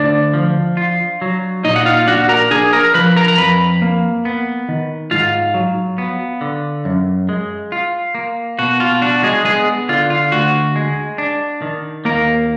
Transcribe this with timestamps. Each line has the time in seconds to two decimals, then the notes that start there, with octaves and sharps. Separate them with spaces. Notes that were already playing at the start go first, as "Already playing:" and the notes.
Already playing: D2 D4 D5
0.34 F3
0.77 F4
1.22 F#3
1.65 A#2 D#4 D#5
1.76 F#5
1.85 F4 F5
2.07 D4 F#4 F#5
2.29 A#4 A#5
2.50 D4 G#4 G#5
2.73 A#4 A#5
2.94 F3 B4 B5
3.16 A#4 A#5
3.28 A#5
3.38 F2 B4 B5
3.82 A#3
4.25 B3
4.69 D#3
5.11 G#2 F4 F5
5.54 F#3
5.98 B3
6.41 D3
6.85 F#2
7.29 G#3
7.72 F4
8.15 A#3
8.59 B2 F#4
8.80 F4
9.02 D4 F#4
9.23 G#3 G#4
9.45 G#3 B3 G#4
9.89 D3 F4
10.10 F4
10.32 D2 F#4
10.76 G#3
11.18 D4
11.62 D#3
12.05 D#2 A#3 A#4